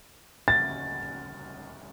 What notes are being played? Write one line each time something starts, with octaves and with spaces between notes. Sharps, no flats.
A6